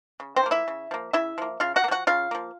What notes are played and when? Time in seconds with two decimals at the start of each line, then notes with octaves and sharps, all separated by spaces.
0.20 C#3
0.36 C4 C5
0.43 F3 A#3
0.51 E4 E5
0.68 C#3
0.91 F3 A#3
1.13 C#3 E4 E5
1.38 F3 A#3
1.60 C#3 F4 F5
1.76 F#4 F#5
1.84 A#3
1.88 F3 F#4 F#5
2.07 C#3 F4 F5
2.31 F3 A#3